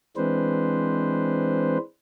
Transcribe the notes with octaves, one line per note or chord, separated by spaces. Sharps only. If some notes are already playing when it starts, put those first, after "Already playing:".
E3 G#3 C4 D4 B4 C5